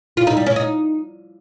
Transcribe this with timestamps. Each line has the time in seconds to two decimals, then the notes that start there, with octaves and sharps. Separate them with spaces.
0.17 F4
0.27 D#4
0.37 G3
0.46 C#4
0.56 D#4